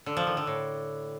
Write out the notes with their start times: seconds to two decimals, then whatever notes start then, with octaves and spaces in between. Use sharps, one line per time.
0.06 D3
0.17 F3
0.27 D#3
0.37 D3
0.47 A2